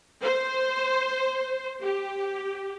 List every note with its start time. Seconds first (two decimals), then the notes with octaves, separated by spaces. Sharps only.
0.22 C5
1.82 G4